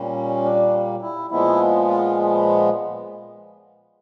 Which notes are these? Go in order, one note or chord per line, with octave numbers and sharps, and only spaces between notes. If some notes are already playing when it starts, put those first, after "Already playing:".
Already playing: A#2 G3 A#3 C#4
D4
E4
A#2 F3 G#3 B3 E4
F4